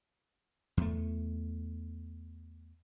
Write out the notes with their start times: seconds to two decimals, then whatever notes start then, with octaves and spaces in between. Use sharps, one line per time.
0.77 E2 A3